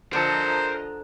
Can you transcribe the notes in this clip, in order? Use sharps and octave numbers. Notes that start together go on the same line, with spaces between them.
D3 F3 A#4 C5 D#5 A5 A#5